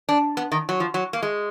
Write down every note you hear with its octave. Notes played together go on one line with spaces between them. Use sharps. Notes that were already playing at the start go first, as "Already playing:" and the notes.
D4
B3
D#3
F#3
F3
F#3
A#3
G#3